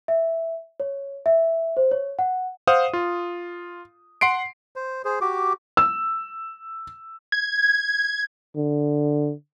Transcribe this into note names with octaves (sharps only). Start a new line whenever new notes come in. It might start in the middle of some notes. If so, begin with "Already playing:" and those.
E5
C#5
E5
C5
C#5
F#5
C5 F5 F#5 D#6
F4
F#5 C6 C7 D7
C5
G#4 C5
F#4 G4 D6
E6
G#6
D3